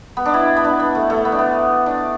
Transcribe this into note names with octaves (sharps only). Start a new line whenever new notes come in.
B3
D4
E4
B3
D4
B3
A3
A3
B3
D4
B3
D4